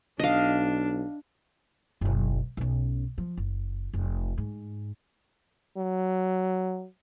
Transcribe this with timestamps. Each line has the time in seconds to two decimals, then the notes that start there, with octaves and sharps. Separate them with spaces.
0.19 B1 D4 D#5 F5
2.01 F#1 B1
2.57 B1 C#4
3.18 F3
3.37 F#1
3.93 F1
4.38 G#2
5.78 F#3